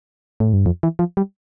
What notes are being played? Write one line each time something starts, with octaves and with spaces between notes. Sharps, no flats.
A2
G2
F2
E3
F3
G3